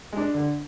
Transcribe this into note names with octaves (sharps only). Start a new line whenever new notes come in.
G#3 D4
D3